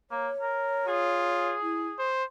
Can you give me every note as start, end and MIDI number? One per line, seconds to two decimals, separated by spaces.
0.11 0.28 58
0.11 1.49 73
0.40 0.87 70
0.87 1.58 65
0.87 2.11 68
1.62 1.87 64
1.99 2.24 72
1.99 2.25 84